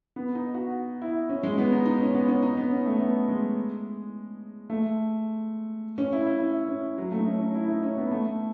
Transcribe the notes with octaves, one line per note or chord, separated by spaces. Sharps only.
B3
D#4
F#4
E4
C#4
G#3
B3
D#4
D#4
C#4
B3
C#4
D#4
B3
C#4
A3
B3
G#3
A3
C#4
E4
E4
E4
C#4
F#3
A3
D#4
C#4
C#4
E4
D#4
C#4
B3
A3